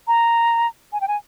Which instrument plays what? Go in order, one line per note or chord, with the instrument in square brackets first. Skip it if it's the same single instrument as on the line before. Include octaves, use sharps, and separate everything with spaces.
[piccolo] A#5
G#5
G5
G#5